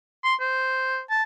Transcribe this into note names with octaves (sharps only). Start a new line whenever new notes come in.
C6
C5
A5